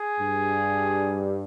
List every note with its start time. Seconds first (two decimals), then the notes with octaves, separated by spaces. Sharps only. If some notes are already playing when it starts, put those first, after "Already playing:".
Already playing: G#4
0.20 G2